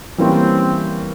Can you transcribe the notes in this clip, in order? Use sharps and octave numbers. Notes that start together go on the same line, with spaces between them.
E3 G3 A#3 C4 C#4 E4